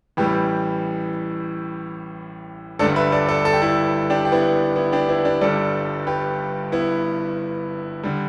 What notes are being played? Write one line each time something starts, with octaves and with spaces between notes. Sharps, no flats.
A1 A2 E3 G3 G4 B4
G1 G2 D3 G3 A4 D5
B4 E5
A4 D5
A4 D5
A4
G4
E4 A4
D4 G4
G4
B3 E4
B3 E4
D4 G4
B3 E4
D4 G4
G1 G2 G3 A4 D5
G4 B4
B3 E4
D3 G3